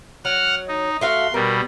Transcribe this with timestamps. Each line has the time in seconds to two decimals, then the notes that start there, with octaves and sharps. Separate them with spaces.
0.25 F#3 F#5 F6
0.68 D#4
1.01 A3 F#4 F5 C6
1.34 B2 G3 A#4